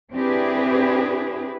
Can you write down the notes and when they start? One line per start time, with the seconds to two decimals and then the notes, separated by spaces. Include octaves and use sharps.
0.13 C4 D4 E4 G4 G#4 B4